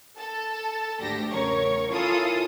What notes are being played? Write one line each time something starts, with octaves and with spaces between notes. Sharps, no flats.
A4 A5
G#1 D2 G4 A#6
E2 C#3 A#4 C#5 C#6
E4 F4 A4 A#4 G#5 D#6